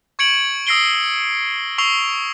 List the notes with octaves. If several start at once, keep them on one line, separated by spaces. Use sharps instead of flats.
C#6 G#6 C#7 D7 F#7
D#6 E6 A#6 C7 D7 G7
C#6 E6 C7 F7 G7